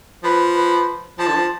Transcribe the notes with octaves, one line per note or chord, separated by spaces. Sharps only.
F3 B4
B4
F3 A5
D3
F3